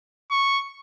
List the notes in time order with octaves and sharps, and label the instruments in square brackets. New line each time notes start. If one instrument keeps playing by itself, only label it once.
[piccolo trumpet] C#6